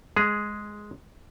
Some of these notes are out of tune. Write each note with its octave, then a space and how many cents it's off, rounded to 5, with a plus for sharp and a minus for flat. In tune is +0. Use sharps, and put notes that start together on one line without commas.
G#3 +5 G#4 +0